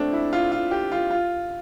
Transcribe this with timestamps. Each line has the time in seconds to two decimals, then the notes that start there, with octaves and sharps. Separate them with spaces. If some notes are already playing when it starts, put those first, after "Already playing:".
Already playing: A3 C4 D4
0.13 E4
0.33 F4
0.52 F4
0.71 G4
0.92 F4
1.11 F4